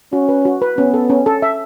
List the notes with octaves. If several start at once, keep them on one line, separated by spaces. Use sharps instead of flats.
C#4 F#4
B4
F#4
B4
B3 C#4
A4
C#4
A4
E5